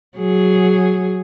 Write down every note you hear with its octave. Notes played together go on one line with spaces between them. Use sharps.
F#3 G#4